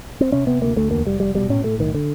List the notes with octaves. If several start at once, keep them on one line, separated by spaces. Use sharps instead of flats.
C4
C3 C#4
C3 B3
D2 A#3
D2 A3
E2 A#3
F1 G3
F1 G3
B2 G3
A2 C#4
A2 A3
B1 D#3
D3